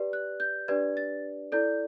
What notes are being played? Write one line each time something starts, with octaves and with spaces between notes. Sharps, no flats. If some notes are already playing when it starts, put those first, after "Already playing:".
Already playing: G4 B4 D5
F#6
G6
D4 G4 B4 D5 G#6
A6
E4 A4 D5 G6